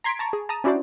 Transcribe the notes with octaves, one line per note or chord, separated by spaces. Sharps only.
A#5 C6 G#6 B6 D7
A5 A#5 C#6
G#4
A5 A#5 D#6
C#4 D4 E4 F#4 C5 D5